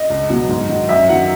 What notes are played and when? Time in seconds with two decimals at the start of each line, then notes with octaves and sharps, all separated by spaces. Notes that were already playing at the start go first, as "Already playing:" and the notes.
Already playing: D#5
0.10 C#2
0.30 B2 F#3
0.49 G#2
0.69 D#3 F#3
0.89 F#2 E5
1.09 D#3 F#3 F#5